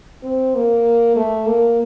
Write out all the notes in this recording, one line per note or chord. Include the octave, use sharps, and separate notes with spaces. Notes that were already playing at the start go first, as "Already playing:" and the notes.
C4
A#3
A3
A#3